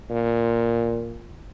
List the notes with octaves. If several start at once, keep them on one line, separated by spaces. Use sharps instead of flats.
A#2